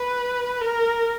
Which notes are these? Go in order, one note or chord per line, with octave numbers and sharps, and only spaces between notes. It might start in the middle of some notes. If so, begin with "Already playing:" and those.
Already playing: B4
A#4